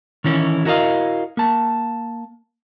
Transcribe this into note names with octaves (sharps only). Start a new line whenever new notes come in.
D#3 E3 C#4 E4
E4 F#4 A#4 D5 D#5 F5
A#3 A5